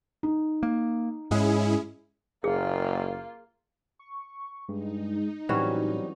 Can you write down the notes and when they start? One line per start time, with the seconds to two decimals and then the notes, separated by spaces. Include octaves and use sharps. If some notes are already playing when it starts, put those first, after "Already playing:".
0.23 D#4
0.63 A#3
1.31 G#2 G#3 C#4 E4 G#4
2.44 F#1 A#3 F4 G#4
3.99 C#6
4.69 G2 G#3 D#4
5.49 A2 E3 F#3 G3 C4 C#4 F#4